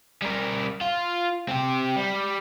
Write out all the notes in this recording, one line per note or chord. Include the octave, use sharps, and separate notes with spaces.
G3 A#4
F4
C4 G4
G3